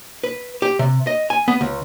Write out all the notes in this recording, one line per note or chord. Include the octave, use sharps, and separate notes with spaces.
B4
G4
C3
D#5
G#5
B3
C#2